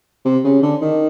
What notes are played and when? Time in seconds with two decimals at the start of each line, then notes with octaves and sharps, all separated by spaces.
0.25 C3
0.44 C#3
0.62 D3
0.82 D#3